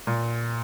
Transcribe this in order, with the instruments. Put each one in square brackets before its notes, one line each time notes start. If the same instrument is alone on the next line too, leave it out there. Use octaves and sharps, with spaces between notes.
[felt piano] A#2